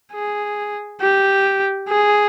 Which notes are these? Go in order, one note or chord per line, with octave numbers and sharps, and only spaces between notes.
G#4
G4
G#4